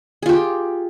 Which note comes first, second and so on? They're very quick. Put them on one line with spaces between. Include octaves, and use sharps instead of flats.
G#4 F4 G4